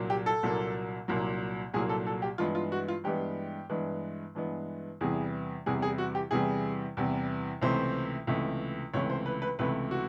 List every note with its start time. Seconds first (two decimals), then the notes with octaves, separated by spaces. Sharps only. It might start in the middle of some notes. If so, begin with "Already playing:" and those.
Already playing: C2 A#2 F#3 A#3
0.10 G4
0.26 A4
0.43 C2 A#2 F#3 A#3
1.08 C2 A#2 F#3 A#3
1.74 C2 A#2 F#3 A#3 G#4
1.89 A4
2.06 A4
2.22 G4
2.38 G2 E3 G#3 B3 F4
2.55 F4
2.72 F#4
2.88 F4
3.04 G2 E3 G#3 B3 G4
3.70 G2 E3 G#3 B3
4.35 G2 E3 G#3 B3
5.01 E2 C3 E3 G3 G#4
5.66 E2 C3 E3 G3 G#4
5.82 G#4
5.98 F#4
6.15 G4
6.31 E2 C3 E3 G3 G#4
6.97 E2 C3 E3 G3
7.62 C#2 C3 E3 A3 C5
8.27 C#2 C3 E3 A3
8.93 C#2 C3 E3 A3 C#5
9.10 C5
9.26 B4
9.42 B4
9.59 C#2 C3 E3 A3 B4
9.91 F#4